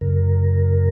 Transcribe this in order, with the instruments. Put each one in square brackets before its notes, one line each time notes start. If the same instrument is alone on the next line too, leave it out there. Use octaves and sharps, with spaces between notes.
[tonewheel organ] F#2 C#3 A#4